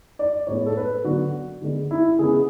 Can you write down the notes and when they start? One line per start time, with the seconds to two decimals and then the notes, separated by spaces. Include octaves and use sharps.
0.19 D5
0.47 A2 G#3 B3 C#5
0.66 A4
0.77 B4
1.04 D3 F#3 B3 F#4
1.62 D3 G#3 B3
1.91 E4
2.19 C#3 G#3 B3 G#4